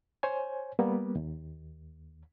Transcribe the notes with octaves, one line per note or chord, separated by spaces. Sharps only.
C5 C#5 G#5
G3 A#3 B3
D#2